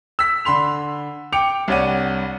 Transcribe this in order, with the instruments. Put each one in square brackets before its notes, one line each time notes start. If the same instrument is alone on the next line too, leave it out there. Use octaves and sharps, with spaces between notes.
[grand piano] E6 B6
D3 B5 C6 F7
G5 D6 C#7 F7
C2 D4 C#5 D5 F#5 D#7